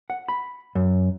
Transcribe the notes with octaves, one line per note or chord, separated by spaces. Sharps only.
F#5
B5
F#2